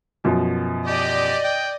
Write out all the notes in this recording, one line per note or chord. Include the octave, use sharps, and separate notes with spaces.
F#2 B2 F3
G4 D5 D#5
G5